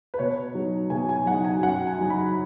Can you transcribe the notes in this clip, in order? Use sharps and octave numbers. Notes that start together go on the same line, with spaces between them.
B4
B2 C#5
F#3 D#4
B2 G#5
G#5
F#3 D#4 F#5
G#5
F#2 F#5
G#5
F#3 D#4
B5